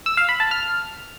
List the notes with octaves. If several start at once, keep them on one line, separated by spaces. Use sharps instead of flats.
E6
F5
B5
A5
F6